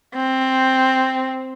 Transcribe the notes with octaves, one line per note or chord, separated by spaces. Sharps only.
C4